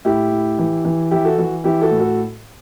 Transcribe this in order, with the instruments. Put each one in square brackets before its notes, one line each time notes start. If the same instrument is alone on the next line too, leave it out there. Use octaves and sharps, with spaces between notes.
[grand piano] A2 E4 G4
A2
E3
E3
E3 E4 G4
F#4 A4
E3 F#4
E3 E4 G4
F#4 A4
A2
F#4 A4